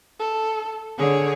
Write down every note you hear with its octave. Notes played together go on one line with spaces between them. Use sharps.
A4
D3 G#4 C#5